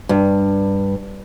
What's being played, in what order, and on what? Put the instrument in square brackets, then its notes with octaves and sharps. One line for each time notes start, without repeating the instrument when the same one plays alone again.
[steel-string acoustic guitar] G2